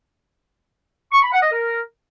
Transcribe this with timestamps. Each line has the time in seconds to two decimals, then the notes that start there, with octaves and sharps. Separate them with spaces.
1.12 C#6
1.22 B5
1.32 F#5
1.42 D#5
1.52 A#4